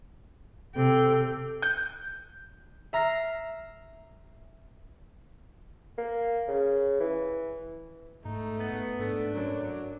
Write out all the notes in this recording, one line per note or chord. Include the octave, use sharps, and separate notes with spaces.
C3 A4 G5
G6
E5 A#5 F6 A#6 C7
A#3
C#3
E3
G#2 A3 D#4
B3
G#2 A3 D4
F#2 F#3